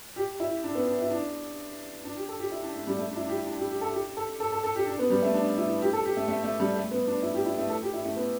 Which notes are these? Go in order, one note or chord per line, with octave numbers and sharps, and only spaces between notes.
G4
E4
D4
B3
D4
E4
D4
D4
G4
A4
G4
E4
D4
A3
G3
A3
D4
E4
D4
G4
E4
D4
G4
G4
A4
G4
A4
A4
A4
A4
G4
D4
B3
G3
A3
D4
E4
G4
A4
G4
A3
A3
A3
G3
A3
B3
D4
E4
G4
E4
A3
A4
G4
E4
A3
B3